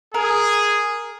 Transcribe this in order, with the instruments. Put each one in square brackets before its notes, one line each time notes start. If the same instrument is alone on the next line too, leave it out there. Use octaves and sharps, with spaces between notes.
[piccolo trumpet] G#4 [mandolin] A#4